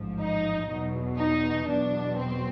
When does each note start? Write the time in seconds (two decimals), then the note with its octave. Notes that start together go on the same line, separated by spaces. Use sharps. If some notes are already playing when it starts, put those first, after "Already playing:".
Already playing: A1 G#2 F3
0.19 D#4
0.69 E2 B2 F#3
1.18 D#4
1.68 E2 B2 F#3 D4
2.18 C4